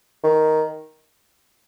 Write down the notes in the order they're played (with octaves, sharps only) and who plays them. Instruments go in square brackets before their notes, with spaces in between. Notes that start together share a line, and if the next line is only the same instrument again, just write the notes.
[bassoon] D#3